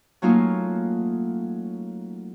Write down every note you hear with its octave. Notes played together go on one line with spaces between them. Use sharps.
F#3 A3 A#3 C#4 D#4 F4